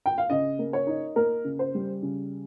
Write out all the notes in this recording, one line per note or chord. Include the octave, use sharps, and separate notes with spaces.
G5
F5
C#3 D#5
A#3
C#5
D#4
A#3 A#4
C#3
C5
G3
C#3